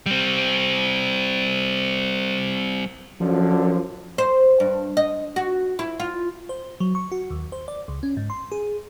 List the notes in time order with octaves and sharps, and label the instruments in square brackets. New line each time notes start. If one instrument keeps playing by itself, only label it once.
[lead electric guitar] G3 C4
[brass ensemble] F#2 D3 [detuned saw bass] F3
[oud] C5
G2
D#5
F#4
E4
F4
[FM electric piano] C5
F#3
C#6
F#4
D#2
C5
D5
C#2
C#4
G#2
C6
G#4